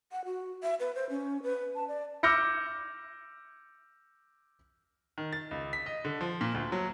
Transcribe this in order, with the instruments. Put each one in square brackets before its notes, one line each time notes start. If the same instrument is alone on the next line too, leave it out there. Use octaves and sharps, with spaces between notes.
[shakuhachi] F#5
F#4
E5
B4
C5
C#4
B4
A5
D5
[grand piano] D6 E6 F6 G6 A#6 C#7
D#3
A6
C#2
B6
D#5
D3
F3
A#2
D2
F#3